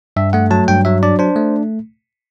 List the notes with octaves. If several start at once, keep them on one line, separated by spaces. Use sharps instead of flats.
G2 E5
A3 F#5
F#3 A5
G2 G5
F#3 E5
D4 D5
D4 C5
A3